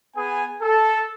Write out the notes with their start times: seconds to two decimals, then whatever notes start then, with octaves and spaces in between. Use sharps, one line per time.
0.16 B3 G#4 G#5
0.62 A4